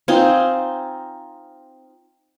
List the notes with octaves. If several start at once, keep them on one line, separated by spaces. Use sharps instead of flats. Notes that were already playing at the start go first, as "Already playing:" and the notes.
C4 D#4 F4 G#5